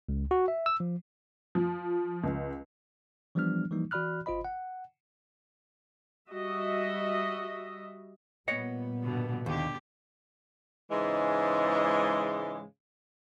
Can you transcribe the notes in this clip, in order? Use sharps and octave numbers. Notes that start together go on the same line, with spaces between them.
C#2
F#4
E5
E6
F3
F3
C#2
E3 F3 G3 B3 D4 F6
E3 F3 G3 A#3 D#4
E3 F#4 D5 B5 F6 F#6
G1 F4 C5 D#5 B5
F#5
G3 F#4 D#5 E5
A#2 G3 B3 C#5 D#5 F#5
G2 B2 D3
D#2 D3 G4
G#2 C#3 E3 G#3